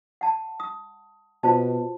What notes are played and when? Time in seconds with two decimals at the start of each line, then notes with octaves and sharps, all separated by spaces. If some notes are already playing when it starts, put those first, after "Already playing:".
0.21 F#5 A5
0.60 D#6
1.43 B2 F4 C5 A5